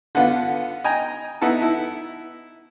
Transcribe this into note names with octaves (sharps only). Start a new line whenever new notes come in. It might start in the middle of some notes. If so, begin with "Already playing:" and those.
D3 B3 F4
D#5 G5 G#5 A#5
B3 D#4 E4 A4
E4